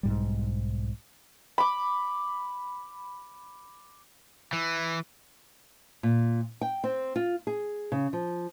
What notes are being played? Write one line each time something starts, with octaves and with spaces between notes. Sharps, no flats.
B1 G#2 G3
B5 D6
E3
A#2
G5
C4
F4
G#4
C#3
F3